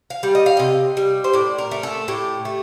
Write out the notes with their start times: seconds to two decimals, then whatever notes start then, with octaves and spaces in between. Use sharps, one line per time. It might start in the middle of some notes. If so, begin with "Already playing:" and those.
0.10 F5
0.23 G3
0.35 D#5
0.46 F5
0.57 C3 D#5
0.97 G3
1.24 C5
1.33 A2 D5
1.58 A#4
1.71 A3
1.83 A4
2.08 A2 G4
2.45 A3